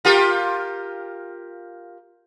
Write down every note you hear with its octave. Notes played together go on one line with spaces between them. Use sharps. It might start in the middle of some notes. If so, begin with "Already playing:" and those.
F4 G4 A#4